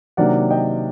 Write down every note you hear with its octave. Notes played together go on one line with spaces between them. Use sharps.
C3 D#3 F#3 A#3 D4 D5 F#5
D#5 G5